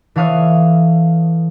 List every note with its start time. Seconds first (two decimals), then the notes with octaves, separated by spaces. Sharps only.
0.16 E3 A4 C#5 F5 D#6